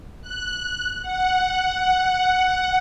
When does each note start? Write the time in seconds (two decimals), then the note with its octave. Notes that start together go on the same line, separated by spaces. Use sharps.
0.22 F#6
1.02 F#5